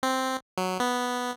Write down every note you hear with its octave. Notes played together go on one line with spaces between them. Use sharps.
C4
F#3
B3